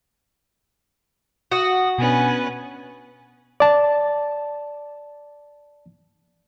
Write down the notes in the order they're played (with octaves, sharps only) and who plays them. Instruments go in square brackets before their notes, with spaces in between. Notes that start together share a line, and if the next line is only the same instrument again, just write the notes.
[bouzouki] F#4 [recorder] D#6
[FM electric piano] B2 D4 [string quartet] B3 C#4 B4 [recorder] G#5
[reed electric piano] D5 A5